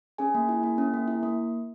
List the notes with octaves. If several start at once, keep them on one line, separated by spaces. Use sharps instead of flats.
C#4 G#4 G#5
A#3
E4
A#3
C#4
A#3
E4
A#3